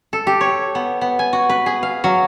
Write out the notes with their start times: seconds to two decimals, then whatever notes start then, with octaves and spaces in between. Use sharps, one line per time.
0.13 A4
0.27 G4
0.41 C#5
0.75 B3
1.01 B3
1.19 G#5
1.33 F#4
1.49 B4
1.66 G#4
1.83 F5
2.04 F#3